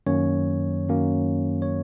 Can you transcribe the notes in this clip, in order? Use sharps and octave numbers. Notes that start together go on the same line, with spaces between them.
F#2 D#3 F#3 A#3 C#4 C#5
F#2 D#3 F#3 A#3 C#4
C#5